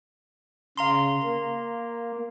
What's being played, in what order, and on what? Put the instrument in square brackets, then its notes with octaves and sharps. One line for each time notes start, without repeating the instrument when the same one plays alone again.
[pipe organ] C#3 [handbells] F5 A#5 C6
[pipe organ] A#3